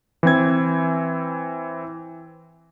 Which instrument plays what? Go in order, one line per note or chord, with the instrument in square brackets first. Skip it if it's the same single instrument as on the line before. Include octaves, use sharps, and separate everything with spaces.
[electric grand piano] E3 C4 G#6